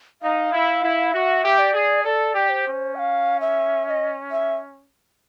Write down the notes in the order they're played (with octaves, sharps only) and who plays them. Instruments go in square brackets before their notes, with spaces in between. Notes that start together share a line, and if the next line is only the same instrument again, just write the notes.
[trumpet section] D#4 [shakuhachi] F5
[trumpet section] E4
E4
[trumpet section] F#4 [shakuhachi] E5
[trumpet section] G4
[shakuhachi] D5
[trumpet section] G#4
[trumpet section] A4 [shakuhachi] D5
[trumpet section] G4
[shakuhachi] C5
[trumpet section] C#4
[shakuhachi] G5
F5
E5
E5
D#5
E5